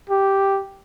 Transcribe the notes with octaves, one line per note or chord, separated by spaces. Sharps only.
G4